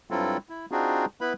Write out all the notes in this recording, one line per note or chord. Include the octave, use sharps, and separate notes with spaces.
G2 F#3 C4 E4 F4 A4
E4
C4 D4 D#4 F4 F#4 G#4
B3 E4 B4 B5